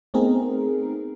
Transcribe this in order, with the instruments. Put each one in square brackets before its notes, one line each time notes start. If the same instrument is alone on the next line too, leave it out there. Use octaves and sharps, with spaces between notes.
[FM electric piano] A3 B3 C4 D#4 G#4 A#4